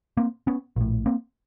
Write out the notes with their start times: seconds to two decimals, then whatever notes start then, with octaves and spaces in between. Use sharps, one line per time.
0.17 A#3 C4
0.47 B3 C#4
0.76 A#1 A2
1.06 A#3 C4